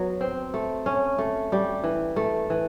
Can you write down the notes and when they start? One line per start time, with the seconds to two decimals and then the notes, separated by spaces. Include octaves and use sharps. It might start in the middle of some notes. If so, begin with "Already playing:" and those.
Already playing: F#3 B3
0.21 C4
0.54 A3
0.86 C#4
1.18 A3
1.52 G3
1.84 E3
2.16 A3
2.50 E3